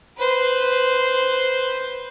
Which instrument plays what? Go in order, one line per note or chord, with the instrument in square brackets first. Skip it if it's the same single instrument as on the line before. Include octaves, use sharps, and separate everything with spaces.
[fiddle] B4 C5